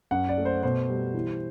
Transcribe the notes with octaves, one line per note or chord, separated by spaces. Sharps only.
F#2 F#5
D5
A3
C5
B2 C5
G3
E3